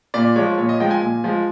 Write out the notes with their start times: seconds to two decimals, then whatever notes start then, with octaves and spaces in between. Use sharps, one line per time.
0.14 A#2 D5
0.36 F3 G#3 C#5
0.58 A#2 C#5
0.69 D#5
0.80 F3 G#3 G5
0.91 G#5
1.01 A#2
1.24 F3 G#3